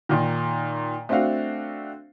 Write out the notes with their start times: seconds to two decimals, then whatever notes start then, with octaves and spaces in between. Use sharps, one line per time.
0.09 A#2 D#3
1.09 A3 C4 D4 F#4 F5